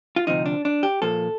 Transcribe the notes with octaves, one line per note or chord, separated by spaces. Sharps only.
F4
D2 C3 F3 D#4
D4
D4
G4
A#2 F3 A#3 A4